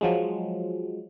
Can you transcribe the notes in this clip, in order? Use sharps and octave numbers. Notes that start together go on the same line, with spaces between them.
F3 F#3 G#3